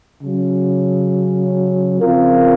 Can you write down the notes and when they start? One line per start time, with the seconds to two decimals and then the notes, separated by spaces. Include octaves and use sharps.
0.23 C#3 F#3 C#4
2.00 C#3 F3 C4 F4 A#4